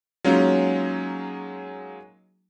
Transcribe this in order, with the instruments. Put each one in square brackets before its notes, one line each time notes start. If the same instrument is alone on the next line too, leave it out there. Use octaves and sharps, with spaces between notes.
[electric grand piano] F#3 G#3 A#3 C#4 D#4 F4